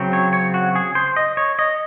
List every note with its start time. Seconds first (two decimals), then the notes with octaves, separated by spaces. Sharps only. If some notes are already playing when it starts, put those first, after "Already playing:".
Already playing: C#3 F#3 C4
0.13 C#5
0.33 C#5
0.54 F#4
0.75 G#4
0.95 C5
1.16 D#5
1.37 C#5
1.59 D#5